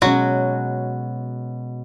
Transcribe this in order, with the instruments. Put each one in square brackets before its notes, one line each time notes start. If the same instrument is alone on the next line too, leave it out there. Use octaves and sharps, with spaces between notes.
[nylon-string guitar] B2 G#3 C#4 [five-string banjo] F#3 F#4